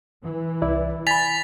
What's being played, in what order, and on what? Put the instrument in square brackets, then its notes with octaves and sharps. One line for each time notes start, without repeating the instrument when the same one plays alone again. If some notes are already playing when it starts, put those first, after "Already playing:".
[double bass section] E3
[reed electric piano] C2 E4 D5
[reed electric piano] G#5 B5 [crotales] A6 B6 F7